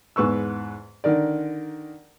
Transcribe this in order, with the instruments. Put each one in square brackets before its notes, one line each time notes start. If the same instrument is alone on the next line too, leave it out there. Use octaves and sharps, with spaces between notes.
[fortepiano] E2 G#2 B4 C#6 E6
D3 D#3 A#4 D5